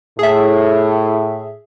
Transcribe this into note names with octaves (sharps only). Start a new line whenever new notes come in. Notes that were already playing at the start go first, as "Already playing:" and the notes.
A2 G#4 E5